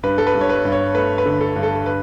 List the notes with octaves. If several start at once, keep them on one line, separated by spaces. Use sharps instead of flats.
G2 B4
A4
B4
G2
C#5
B4
G2
C#5
A3 B4
B4
D3
A4
G2
A4
B4